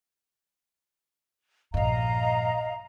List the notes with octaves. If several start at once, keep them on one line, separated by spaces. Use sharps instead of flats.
A#1 G2 D#5 F5 A#5